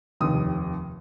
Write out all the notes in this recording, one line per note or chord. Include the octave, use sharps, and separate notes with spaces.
F1 D#2 D#3 D#6